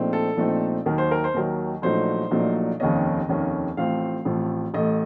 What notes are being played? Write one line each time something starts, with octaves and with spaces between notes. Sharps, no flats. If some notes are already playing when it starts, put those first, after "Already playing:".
Already playing: A#1 A#2 A3 C4 D#4
A4
A#1 A#2 A3 C4 D#4
D#2 D#3 F#3 A#4
C5
A#4
C5
D#2 D#3 F#3 A#4
A#1 A#2 F#3 A3 D#4 C5
A#1 A#2 F#3 A3 D#4
F1 D#2 D#3 A#3 C#4 D#5
F1 D#2 D#3 A#3 C#4
A1 A2 F3 A3 C4 F5
A1 A2 F3 A3 C4
A1 A2 A3 D#5